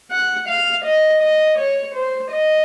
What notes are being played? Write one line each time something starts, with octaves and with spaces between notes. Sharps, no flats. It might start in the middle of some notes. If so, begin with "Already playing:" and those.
F#5
F5
D#5
D#5
C#5
C5
D#5